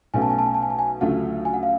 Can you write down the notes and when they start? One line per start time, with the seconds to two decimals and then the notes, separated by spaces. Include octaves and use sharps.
0.14 B1 B2 A3 C#4 F#4 G#5
0.22 A5
0.30 G#5
0.39 A5
0.46 G#5
0.55 A5
0.62 G#5
0.70 A5
0.79 G#5
1.01 D2 C#3 F#3 A3 F4 F#5
1.45 G#5
1.53 F#5
1.63 F5